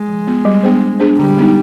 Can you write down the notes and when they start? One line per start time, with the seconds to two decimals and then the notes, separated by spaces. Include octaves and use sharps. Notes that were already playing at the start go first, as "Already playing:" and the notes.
Already playing: G#3
0.08 F3
0.27 B3 F4
0.45 G3
0.63 B3 D4 G#4 C5
0.82 G3
1.00 B3 D4 G#4 C5
1.19 D3 G3
1.37 G#3 B3 D#4